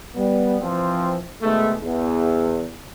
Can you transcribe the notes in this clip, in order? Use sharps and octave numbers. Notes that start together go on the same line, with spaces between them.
G3 B3
E3 F3 C4
B2 D#3 G#3 A3
E2